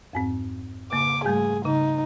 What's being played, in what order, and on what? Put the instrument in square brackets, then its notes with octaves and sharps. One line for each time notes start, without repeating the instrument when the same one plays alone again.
[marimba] F2 G#2 C4
[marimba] C#3 A#3 [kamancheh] D6
[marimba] G#2 G3 A3 [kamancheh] G#4
[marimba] C#3 [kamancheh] D#4